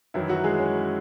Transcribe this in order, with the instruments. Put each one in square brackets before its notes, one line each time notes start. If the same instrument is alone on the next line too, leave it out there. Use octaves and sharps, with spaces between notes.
[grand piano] F#2 D#3 E3 F#3 E4
F#3 F#4
G#3 G#4
C#4